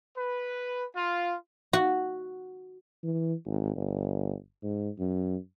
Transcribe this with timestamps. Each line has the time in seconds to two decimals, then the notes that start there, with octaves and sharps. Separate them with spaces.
0.16 B4
0.95 F4
1.73 F#4
3.04 E3
3.46 G#1
3.76 G1
4.63 G#2
4.99 F#2